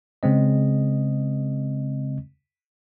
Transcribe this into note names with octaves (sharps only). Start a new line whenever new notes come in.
C#3 G#3 C4 D#5